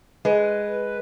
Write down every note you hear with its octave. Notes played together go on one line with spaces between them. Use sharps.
G#3 B4